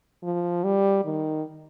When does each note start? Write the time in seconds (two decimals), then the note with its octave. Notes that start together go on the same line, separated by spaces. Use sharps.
0.24 F3
0.64 G3
1.05 D#3